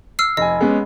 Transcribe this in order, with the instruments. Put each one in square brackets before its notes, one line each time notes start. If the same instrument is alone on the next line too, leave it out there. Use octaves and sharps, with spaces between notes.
[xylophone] E6 F6 C7
[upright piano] F1 G#5 [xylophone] D#5
[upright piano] G#3 B3 C#4